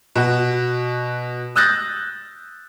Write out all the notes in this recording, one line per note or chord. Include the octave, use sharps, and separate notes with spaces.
B2 F#4
D#6 E6 F#6 G6 A6 A#6